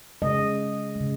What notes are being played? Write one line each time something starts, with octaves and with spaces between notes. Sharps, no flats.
C#3 G#3 D#5
C#3 G#3